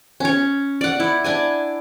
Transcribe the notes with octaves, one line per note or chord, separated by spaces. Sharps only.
C#4 C#5
D5 F#5
E4
D4 D5 G#5